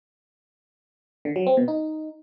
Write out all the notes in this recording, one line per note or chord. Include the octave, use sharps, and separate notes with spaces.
D3
F#3
C4
B2
D#4